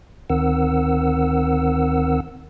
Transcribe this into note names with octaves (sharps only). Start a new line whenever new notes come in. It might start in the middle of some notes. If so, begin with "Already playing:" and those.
D2 D#3 C4 A#4 F#5 E6